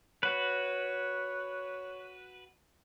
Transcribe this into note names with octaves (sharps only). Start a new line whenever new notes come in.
F#4 B4 C#5